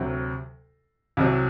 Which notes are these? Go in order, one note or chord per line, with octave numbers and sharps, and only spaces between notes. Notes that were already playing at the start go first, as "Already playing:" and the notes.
Already playing: D2 C3 F#3
C2 C3 F#3